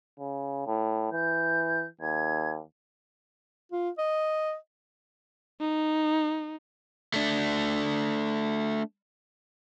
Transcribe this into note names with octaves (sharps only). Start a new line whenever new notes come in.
C#3
A2
E3 G6
D#2 G#6
F4
D#5
D#4
A3 D4